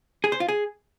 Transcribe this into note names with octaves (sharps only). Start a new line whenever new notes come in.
G#4
C5
F4
G#4